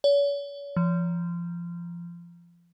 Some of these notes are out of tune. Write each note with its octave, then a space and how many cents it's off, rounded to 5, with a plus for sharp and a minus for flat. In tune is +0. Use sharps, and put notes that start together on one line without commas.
C#5 +40
F3 -25